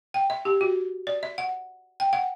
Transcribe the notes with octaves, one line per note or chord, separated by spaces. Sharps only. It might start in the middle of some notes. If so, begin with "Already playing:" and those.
G5
E5
G4
F#4
D5
E5
F#5
G5
F#5